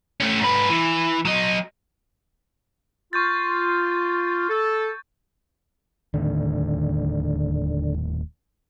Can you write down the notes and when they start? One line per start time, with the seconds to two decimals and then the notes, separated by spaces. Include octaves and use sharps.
0.20 A3 C#4
0.40 G#2 B4
0.70 E3
1.25 F#3 D#5
3.13 F4 C#6 G6 A6
4.49 A4
6.14 D#1 A2 D3 D#3